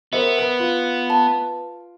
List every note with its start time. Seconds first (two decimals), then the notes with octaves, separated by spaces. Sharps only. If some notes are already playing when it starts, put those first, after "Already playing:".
0.13 B3 A#4 C5 E5
0.38 B4 D7
0.60 F4
1.10 A5